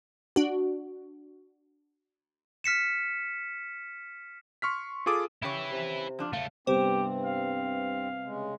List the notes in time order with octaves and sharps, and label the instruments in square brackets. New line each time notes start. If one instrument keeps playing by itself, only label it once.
[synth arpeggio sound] D4 F#4
[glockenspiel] F6 B6 C#7 E7
[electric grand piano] C6 C#6 F6 B6
F4 G#4 A4 D6 D#6
[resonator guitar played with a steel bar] C#3 G4 C#5 [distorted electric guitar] E4 B4
[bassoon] C3
[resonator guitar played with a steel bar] F3 D4 F4
[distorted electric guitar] C#3 A3 [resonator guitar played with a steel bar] F5
[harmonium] G2 C4 [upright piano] C3 G3 B3 [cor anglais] G4 [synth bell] C5
[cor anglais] F5
[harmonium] C#3 G#3